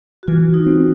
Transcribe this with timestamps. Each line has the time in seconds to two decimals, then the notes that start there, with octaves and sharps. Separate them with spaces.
0.23 F#4
0.28 E3 F4
0.54 D#4
0.66 C4